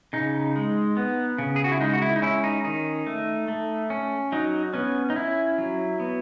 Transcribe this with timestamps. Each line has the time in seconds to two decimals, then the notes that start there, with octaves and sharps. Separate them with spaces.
0.13 C#3 D#4
0.56 G#3
0.97 B3
1.38 C#3
1.56 G#4
1.64 F#4
1.72 E4
1.80 G#3 D#4
1.93 F#4
2.02 E4
2.16 D#4
2.22 C#4 E4
2.44 D#4
2.64 D#3 D#4
3.06 A3
3.48 A3
3.90 C#4
4.32 F#3 D#4
4.73 B3 C#4
5.10 D#4
5.16 C#4 E4
5.58 F#3
6.00 B3